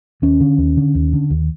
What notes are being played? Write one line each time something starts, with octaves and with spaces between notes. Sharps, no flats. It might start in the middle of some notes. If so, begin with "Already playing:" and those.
D#2 C#4
D3
D#2
D3
D#2
D3
D#2